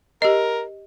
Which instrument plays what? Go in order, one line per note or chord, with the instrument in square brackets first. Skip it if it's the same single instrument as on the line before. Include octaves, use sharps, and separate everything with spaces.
[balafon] G4 D#5 [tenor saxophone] A#4